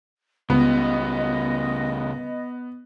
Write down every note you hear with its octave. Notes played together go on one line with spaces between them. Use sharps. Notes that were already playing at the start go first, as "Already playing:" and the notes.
C#2 C#3 G3 B3 D#5